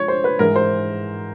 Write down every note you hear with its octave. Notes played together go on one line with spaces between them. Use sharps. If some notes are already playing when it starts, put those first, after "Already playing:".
Already playing: F3 G#3 C#5
C5
B4
G#2 E3 G#3 A#4
C5